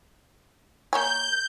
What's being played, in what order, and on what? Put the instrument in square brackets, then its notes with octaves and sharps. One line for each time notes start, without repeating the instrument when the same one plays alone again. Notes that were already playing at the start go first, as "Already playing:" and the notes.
[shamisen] A#3 C#5 G#5 [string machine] G6